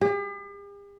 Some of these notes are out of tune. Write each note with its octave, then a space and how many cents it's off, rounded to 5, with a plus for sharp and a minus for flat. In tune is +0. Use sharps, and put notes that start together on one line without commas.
G4 +45